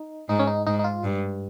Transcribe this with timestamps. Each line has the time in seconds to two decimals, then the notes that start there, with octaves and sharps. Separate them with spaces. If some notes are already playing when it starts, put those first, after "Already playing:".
Already playing: D#4
0.29 G#2 D#4
0.39 C#4
0.47 D#4
0.67 G#2 D#4
0.79 D#4
0.84 F4
1.04 G2